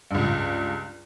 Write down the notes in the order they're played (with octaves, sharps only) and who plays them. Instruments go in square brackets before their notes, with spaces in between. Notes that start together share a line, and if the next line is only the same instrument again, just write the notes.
[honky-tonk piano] C#2 G2